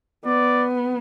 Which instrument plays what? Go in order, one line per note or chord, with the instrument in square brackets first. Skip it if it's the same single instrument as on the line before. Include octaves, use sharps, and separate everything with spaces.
[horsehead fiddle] B3 [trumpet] D5